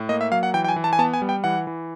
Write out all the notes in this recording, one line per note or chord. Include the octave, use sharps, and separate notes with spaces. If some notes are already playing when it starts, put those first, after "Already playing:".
Already playing: A2
A#3 D#5
E5
F#3 F5
F#5
E3 G5
G5
G#5
E3
A5
G#5
B3 A5
G#5
G3
G5
E3 F#5
E3